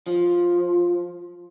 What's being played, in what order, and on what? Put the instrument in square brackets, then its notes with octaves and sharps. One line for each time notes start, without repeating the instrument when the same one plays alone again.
[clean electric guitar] F3